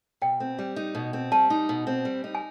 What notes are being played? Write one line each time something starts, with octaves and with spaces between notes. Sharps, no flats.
B2 G5
C4
G3
D#4
B2
C4
G3 A5
D#4
B2
C4
G3
D#4
G#5